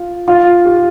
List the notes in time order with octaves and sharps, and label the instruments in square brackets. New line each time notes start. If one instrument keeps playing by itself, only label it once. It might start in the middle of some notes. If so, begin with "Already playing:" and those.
Already playing: [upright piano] F4
F4
G4